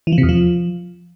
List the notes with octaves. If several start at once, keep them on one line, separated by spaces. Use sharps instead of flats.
E3
F3
C3
E2
F3